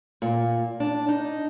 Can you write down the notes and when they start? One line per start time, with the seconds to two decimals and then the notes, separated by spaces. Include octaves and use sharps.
0.22 A#2
0.80 D4
1.08 D#4